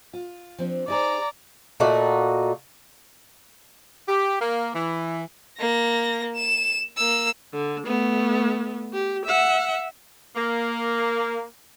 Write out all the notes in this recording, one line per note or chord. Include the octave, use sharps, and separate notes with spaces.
F4
F3 C4 D4
D#4 G#4 C5 D5 A#5
A#2 A3 D#4 F#4
G4
A#3
E3
A#3 A#6
E7
A#3 E6
D3
A3 B3
G4
E5 F#5
A#3